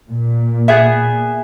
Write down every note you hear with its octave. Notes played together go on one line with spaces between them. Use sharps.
A#2
B3 G#4 E5